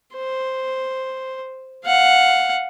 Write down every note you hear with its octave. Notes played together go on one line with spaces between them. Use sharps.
C5
F5 F#5